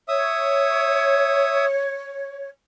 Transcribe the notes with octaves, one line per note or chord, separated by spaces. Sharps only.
C#5 E5 D#6